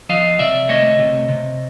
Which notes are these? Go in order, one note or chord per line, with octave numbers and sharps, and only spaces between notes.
F3 D#5 F5
C3 D5 E5
A3 C#5 D#5
C3
C3